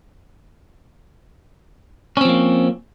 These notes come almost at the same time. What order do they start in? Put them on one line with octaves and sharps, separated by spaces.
C#4 C4 F3 A#3